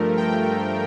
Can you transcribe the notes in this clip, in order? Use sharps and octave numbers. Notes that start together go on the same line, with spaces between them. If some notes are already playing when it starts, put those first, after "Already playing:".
Already playing: G2 F3 A3 A#4
G5